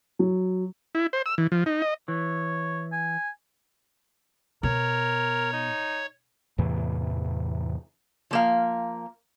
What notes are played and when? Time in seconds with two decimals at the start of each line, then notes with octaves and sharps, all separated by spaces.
0.19 F#3
0.95 E4
1.13 C5
1.26 E6
1.38 E3
1.52 F3
1.66 D#4
1.82 D#5
2.08 E3 C#5
2.92 G#5
4.63 B2 A#4 C#5
5.53 D#4
6.58 E2 A2 C3 E3
8.31 F3 A#3 F5